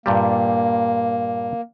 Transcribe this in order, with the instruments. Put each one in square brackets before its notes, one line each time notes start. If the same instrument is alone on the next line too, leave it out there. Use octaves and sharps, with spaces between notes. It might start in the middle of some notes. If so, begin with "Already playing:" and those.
[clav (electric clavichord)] G2 A#2 G3 [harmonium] A#3